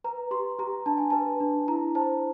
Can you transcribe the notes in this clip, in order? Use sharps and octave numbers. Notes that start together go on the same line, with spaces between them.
B4 A#5
G4 C6
G4 A#5
D4 A5
G#5
B4 A5
D4
E4 A#5
C5 A5